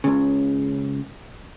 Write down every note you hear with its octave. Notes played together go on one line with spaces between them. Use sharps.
C#2 C#3